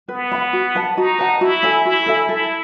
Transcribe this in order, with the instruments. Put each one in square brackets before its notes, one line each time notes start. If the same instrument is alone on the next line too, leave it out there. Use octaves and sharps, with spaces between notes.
[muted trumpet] B3 [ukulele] B4
[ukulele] F#5 B5
F#4
B4 F#5 A5
[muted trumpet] D#4 [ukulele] F#4
[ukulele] B4 F#5 A5
[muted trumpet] E4 [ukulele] F#4
[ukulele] A4 E5 G#5
[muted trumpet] E4 [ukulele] F#4
[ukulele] A4 E5 G#5
[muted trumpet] E4 [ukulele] A4